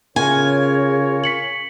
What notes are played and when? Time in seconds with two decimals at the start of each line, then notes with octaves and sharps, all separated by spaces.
0.16 C#3 F4 A#4 C#5 G#5
1.24 B6 C#7 F#7